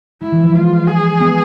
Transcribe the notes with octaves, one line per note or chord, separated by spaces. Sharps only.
G#3 E4
E3
F3
G#3 F4
G#4
G#3 B3